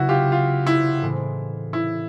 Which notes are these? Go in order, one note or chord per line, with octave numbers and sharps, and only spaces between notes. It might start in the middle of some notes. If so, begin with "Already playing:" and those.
Already playing: C#3 F#3 B3 E4 F#4
F4 G4
F4
E4
A2 E3 G#3 C4
E4